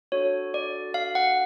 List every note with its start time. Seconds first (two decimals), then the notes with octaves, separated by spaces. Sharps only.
0.12 D4 F#4 A4 C#5
0.54 D5
0.94 F5
1.15 F#5